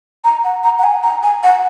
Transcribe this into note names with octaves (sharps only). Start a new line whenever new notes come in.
A#5
F#5
A#5
F#5
G#5
A#5
G#5
F#5